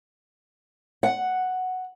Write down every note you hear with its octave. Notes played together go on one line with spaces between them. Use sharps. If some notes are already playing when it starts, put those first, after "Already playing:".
F#5